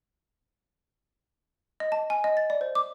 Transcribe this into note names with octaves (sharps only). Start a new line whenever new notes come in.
D#5
A5
G#5
D#5
A6
D5
C5
D6